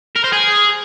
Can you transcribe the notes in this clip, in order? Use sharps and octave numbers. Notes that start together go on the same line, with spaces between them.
A#4
C5
G#4